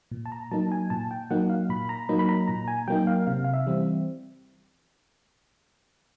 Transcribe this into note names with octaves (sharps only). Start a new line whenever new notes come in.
A#2
A5
A#5
F#3 A#3 D#4 A5
G#5
A#2 A5
G5
F#3 A#3 D#4 F#5
F5
A#2 B5
A#5
F#3 A#3 D#4 B5
B5
A#5
A#2 A#5
G#5
F#3 A#3 D#4 G5
F5
C3 F5
F5
E5
E3 G3 C4